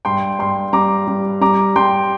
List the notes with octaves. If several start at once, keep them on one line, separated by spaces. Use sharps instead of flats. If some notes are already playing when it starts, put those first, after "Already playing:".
G2 G5 C6
G2 G5 C6
G3 A#5 D6
G3
G3 A#5 D6
G3 G5 C6